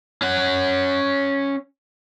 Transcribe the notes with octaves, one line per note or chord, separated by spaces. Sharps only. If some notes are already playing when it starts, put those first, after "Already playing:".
C#4 F#5